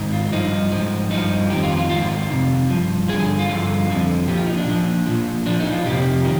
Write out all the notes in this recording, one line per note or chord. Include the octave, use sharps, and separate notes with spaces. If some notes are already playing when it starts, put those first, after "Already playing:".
Already playing: G#2 D#3
F4
G2 F3 D#4
G#2 F3
G2 F3 D#4
F2 D#3 G4
F4
F4
G#2 D#3 F4
F2 C3
G2 F3
G2 D3 F3 G#4
G#4
F4
G2 D3 F3
F2 D3 F3
A#2 F3 G4
F4
D#4
D4
A#2 F3
A#2 F3
A#2 F3 D4
D#4
F4
F2 C3 F3 G4
D#3